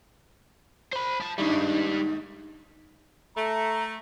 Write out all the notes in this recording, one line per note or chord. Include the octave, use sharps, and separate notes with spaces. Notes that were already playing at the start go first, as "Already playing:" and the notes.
C5 B5
F3 A5
D#2 G#2 G3 D4 D#4
A3 A#5